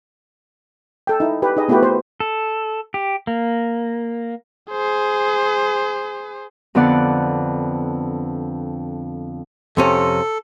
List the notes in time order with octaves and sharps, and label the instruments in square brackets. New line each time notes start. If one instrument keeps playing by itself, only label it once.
[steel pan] A4 G5
D#4 E4
G4 B4
D#4 G#4 D#5
A3 B3 E4 F#4 G4 B4
C5
[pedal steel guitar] A4
G4
A#3
[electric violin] G#4 C5
[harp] F2 D3 B3 D5 F#5
[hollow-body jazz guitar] F2 C3 C#4 [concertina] A4